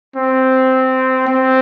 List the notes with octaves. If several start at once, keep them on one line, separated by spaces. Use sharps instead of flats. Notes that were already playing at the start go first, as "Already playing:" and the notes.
C4
C4